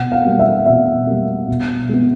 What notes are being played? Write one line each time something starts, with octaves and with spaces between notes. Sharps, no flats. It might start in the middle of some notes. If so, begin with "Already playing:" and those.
Already playing: B2 F#5
F5
G3 A#3
E5
B2 E5
G3 A#3
B2
G#3 B3